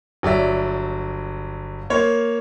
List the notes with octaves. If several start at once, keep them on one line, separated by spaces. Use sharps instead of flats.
G1 F#3 D5 E5
A#3 C5 C#5